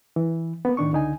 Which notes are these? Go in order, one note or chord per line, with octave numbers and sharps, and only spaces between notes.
E3
A#3 B3
A2 D#3 D4 C#6
C#2 D3 D#4 G#5